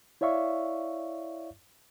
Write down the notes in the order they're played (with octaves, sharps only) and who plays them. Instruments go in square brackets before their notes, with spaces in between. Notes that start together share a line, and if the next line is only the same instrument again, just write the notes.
[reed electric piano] E4 C#5 D5 E5 F5 C#6